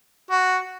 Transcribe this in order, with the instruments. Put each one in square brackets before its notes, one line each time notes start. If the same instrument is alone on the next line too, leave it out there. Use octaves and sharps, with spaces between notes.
[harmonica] F#4